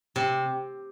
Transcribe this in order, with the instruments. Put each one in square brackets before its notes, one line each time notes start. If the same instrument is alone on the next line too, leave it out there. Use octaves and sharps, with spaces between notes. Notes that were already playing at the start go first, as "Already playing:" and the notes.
[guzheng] C3 [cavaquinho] G4